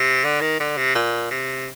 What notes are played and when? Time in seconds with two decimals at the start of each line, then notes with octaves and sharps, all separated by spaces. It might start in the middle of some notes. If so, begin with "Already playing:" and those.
Already playing: C3
0.24 D3
0.41 D#3
0.60 D3
0.77 C3
0.95 A#2
1.31 C3